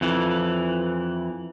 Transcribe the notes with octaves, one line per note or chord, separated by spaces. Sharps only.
F2 E3